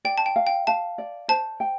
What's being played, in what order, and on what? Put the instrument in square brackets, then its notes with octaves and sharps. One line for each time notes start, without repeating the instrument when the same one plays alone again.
[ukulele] D5 [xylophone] G5
[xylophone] A5
G5
[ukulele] F5
[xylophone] G5
[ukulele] F5 [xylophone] A5
[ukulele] D5
[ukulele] C5 [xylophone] A5
[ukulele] G5